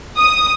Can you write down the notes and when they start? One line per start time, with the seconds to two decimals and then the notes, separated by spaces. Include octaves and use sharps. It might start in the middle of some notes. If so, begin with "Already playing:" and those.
0.17 D#6